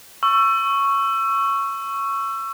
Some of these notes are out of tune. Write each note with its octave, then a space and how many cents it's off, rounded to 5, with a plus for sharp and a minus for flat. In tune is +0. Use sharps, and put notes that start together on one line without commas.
C#6 +0 E6 +25